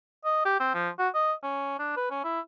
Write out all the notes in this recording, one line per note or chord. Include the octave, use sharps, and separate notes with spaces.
D#5
G4
C4
F3
F#4
D#5
C#4
D4
B4
C#4
E4